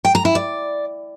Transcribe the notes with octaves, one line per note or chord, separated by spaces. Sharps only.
G5
A#5
E4
D5